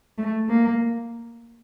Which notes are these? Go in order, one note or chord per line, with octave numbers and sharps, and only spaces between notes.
A3
A#3